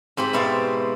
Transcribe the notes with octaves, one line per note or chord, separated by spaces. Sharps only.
G#2 C4 G4 B5
B2 E4 D5 F5